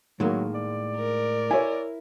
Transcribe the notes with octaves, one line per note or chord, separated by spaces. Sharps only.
A2 D#3 F#3 G#3 A#3
D5
A#4
E4 C#5 E5 G#5